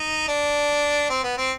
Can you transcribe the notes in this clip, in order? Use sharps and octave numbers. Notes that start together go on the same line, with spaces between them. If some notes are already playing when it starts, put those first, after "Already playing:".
Already playing: D#4
D4
C4
B3
C4